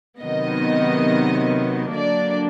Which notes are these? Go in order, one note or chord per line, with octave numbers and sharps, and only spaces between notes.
C3 D#3 F#3 B3 D#5
D3 F#3 A#3 D4 D5